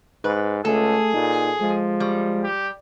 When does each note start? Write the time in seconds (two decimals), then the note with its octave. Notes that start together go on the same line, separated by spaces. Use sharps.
0.24 G#2 B4
0.65 C#2 A3 G#4 A4
1.14 A#2 D#4
1.61 F3 G#3
2.00 G3
2.44 G4